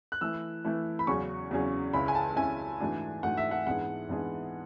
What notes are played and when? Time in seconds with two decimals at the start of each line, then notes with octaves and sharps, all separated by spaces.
0.12 F#6
0.21 E3 A3 E4 E6
0.64 E3 A3 E4
0.99 B5
1.07 E2 C#3 F#3 C#4 G#4 C#6
1.51 E2 C#3 F#3 C#4 G#4
1.93 C#2 C#3 G#3 C#4 E4 B5
2.08 G#5
2.15 A5
2.36 C#2 C#3 G#3 C#4 E4 G#5
2.80 G#2 E3 A3 D4 F#4
3.23 G#2 E3 A3 D4 F#4 F#5
3.37 E5
3.51 F#5
3.66 G#2 E3 B3 D4 G#4 F#5
4.09 G#2 E3 B3 D4 G#4